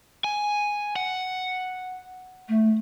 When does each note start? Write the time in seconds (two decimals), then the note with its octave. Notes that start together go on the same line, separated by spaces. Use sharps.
0.24 G#5
0.96 F#5
2.49 A3